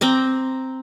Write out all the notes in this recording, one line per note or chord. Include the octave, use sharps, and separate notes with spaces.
C4 A#5 D6